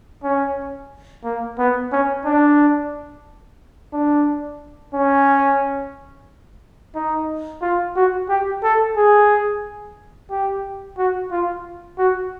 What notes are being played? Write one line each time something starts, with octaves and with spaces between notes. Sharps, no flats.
C#4
A#3
B3
C#4
D4
D4
C#4
D#4
F4
F#4
G4
A4
G#4
G4
F#4
F4
F#4